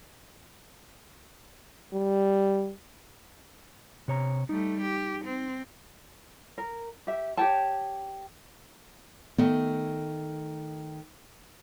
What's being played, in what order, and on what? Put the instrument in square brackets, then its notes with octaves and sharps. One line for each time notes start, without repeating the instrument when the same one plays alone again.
[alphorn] G3
[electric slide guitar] C3 C#5 A#5
[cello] G3 A3 [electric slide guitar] D#4
[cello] G4
C4
[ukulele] A#4
G4 E5
G4 C#5 G5 A5
[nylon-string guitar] D#3 A3 [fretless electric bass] B3